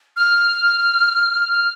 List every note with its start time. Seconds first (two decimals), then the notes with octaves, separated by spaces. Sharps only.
0.16 F6
1.52 F6